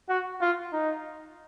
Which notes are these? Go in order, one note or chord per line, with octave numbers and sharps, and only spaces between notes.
F#4
F4
D#4